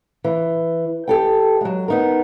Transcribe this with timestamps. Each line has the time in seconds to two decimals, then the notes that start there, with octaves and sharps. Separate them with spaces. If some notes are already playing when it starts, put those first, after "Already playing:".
0.24 E3
1.08 G4 A4 G5
1.61 F#3 G#3
1.88 B3 D#4 A#4